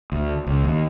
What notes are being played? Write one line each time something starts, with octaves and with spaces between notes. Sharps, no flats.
D2
C#2
D#2